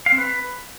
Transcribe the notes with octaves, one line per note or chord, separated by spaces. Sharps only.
F5
C4
B4